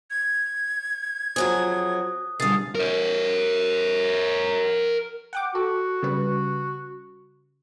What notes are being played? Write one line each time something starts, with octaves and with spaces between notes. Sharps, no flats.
G#6
F2 F#3 G#4 C5 D#6 F#6
B2 D3 G3 G#4 F5 D#6 A6 C7
A#4 C#5
F#5 G5 D6
F#4 A4
C#3 G3 B4